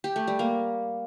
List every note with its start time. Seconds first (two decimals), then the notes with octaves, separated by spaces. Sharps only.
0.04 G4
0.16 A3
0.27 G3
0.39 A#3